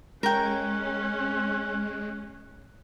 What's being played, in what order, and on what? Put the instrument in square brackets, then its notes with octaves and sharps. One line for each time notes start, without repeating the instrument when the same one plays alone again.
[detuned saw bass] G#3 [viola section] C#4 [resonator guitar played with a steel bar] A#4 G5 [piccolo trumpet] F#6